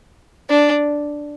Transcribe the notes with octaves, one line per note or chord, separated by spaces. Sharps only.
D4